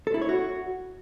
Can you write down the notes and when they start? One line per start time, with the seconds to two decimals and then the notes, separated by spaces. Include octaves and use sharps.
0.07 A4
0.14 E4
0.22 C#5
0.29 F#4